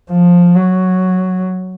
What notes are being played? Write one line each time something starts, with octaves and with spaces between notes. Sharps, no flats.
F3
F#3